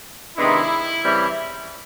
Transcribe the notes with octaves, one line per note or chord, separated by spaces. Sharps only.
C3 D#3 G#3 B3 D4 E4
C#3 E3 G3 C4